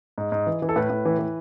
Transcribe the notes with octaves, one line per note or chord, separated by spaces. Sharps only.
G#2
G#2
E3
E3
A4
A2 B4
A2
E3
E3